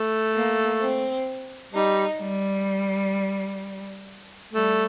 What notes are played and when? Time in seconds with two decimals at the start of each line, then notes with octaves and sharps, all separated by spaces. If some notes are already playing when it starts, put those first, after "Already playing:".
Already playing: A3
0.33 A#3
0.80 C4
1.72 G3 D#4
2.19 G3
4.53 G3 A3